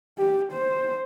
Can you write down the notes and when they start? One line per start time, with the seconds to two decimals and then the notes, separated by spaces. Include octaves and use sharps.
0.18 G4
0.52 C5